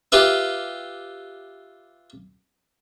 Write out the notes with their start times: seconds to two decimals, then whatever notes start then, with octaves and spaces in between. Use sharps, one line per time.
0.12 F4 G4 B4 E5